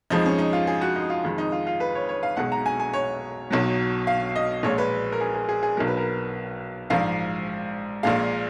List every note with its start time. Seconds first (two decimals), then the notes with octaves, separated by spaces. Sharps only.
0.10 F2 F3 G#3 D#4
0.26 C#4
0.38 D#4
0.53 F4
0.67 G#4
0.81 F#4
0.96 D#4
1.10 F4
1.24 F2 D#3 G#3
1.38 D#4
1.52 F4
1.67 F4
1.80 B4
1.95 C#5
2.09 C#5
2.23 F5
2.37 B1 B2 G#3 F#5
2.52 A#5
2.66 G#5
2.80 G#5
2.93 C#5
3.50 B1 B2 F#3
4.07 F5
4.36 D#5
4.63 A#1 A#2 G#3 C#5
4.78 B4
5.12 A#4
5.21 G#4
5.34 G#4
5.49 G#4
5.63 G#4
5.77 B1 B2 F#3 A#4
5.87 B4
5.97 A#4
6.90 A#1 G#2 F3 F5
8.03 A#1 A#2 G#3 F5